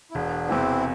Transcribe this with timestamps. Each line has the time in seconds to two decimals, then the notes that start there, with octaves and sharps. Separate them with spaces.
0.11 E4
0.15 E1 B3 D4
0.49 E2 C3 E3 C4 E4